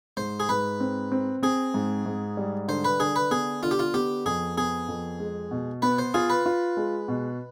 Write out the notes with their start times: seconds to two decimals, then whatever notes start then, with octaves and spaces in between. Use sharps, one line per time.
0.17 G#2 C5
0.40 G#4
0.49 G#2 B4
0.80 C4
1.12 C4
1.43 C4 G#4
1.74 G#2
2.06 G#2
2.37 G3
2.68 D3 C5
2.85 B4
3.00 D3 G#4
3.16 B4
3.31 B3 G#4
3.63 D3 F4
3.71 G4
3.79 F4
3.94 B3 G4
4.26 F2 G#4
4.57 B3 G#4
4.88 F2
5.20 G#3
5.51 B2
5.82 B3 B4
5.99 C5
6.14 F4 G#4
6.30 B4
6.46 F4
6.77 G#3
7.08 B2